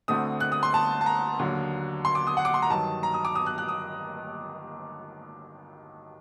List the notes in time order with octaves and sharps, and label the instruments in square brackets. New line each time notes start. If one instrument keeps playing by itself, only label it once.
[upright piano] D2 D3 A3 C4 D#6
F#6
D#6
C6
A5
A5
A#5
D#2 D3 F#3
C6
D6
D#6
F#5
D6
C6
A#5
G2 D#3 F#3 A5
A#5
D#6
D6
D#6
F#6
F#6
D#6